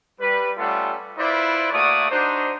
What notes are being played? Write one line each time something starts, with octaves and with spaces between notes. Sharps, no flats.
G3 B4
G3 A3 C#4 F4 A4 F#5
E4 F4 B4 C5 D5
A3 A#3 F#4 C#5 D5 D#6
D4 D#4 F#4 C5